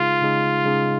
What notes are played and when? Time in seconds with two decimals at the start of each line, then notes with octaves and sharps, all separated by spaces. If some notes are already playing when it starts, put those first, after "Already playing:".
Already playing: C#3 G#3 D#4 F4 G#4
0.22 C#3 G#3 D#4 G#4
0.65 C#3 G#3 D#4 G#4